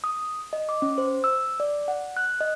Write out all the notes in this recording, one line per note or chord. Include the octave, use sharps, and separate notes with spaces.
D#6
D#5
D6
C#4
C5
E6
D5
F#5
F#6
D#5